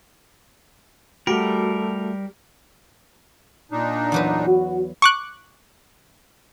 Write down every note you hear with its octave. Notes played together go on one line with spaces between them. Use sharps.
G3 A3 F#4 G4 A#4
A#2 D4 D#4
E2 F#3 B4
F#4
C#6 D6 F#6